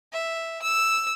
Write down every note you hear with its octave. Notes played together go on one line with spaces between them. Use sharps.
E5
E6